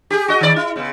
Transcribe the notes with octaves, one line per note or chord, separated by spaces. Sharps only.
G4 G#4
F#4 D#5
D#3 D5
E4
C#3 B3